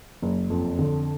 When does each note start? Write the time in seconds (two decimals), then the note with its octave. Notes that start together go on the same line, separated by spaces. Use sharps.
0.22 F#1
0.50 F2
0.79 D3